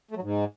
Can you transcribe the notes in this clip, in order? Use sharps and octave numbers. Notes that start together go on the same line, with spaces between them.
A3
F#3
G#2